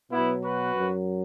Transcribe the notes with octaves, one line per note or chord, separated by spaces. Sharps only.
B2 F#3 B3 E4
F#4 B4
F#2 F#3